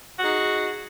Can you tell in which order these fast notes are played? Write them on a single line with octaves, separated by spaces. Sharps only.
F#4 G#4 D#4